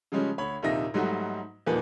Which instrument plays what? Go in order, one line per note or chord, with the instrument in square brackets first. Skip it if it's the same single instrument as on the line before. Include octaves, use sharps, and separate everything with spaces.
[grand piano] C#3 F3 G3 G#3 C#4
D2 C#5 B5
A#1 D#2 C3 D#4 E5 A#6
G#2 F#3 G3 A3 D#4 F#4
D#1 E2 D#3 F3 A#3 B4